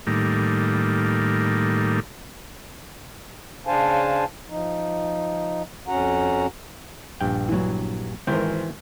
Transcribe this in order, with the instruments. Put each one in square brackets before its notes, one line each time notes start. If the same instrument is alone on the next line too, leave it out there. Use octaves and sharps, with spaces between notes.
[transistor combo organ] A2 D#3 G3 A#3
[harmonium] C#3 D4 C5 F5 G#5 A5
F3 D#4
F2 C#4 F#4 F#5 A#5
[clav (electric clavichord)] A#1 G2 G5
[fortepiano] E3 F#3
[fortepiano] G#1 A#4 [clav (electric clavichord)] E3 C5 G5